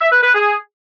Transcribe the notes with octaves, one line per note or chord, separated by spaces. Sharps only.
E5
B4
B4
G#4